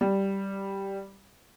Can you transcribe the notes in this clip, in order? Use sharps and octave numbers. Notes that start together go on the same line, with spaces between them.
G3